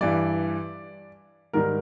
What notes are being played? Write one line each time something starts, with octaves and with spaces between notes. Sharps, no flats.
G2 E3 G3 D5
G#2 D#3 G3 A#4